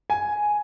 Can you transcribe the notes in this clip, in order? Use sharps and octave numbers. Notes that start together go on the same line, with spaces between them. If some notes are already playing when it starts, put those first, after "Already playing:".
G#5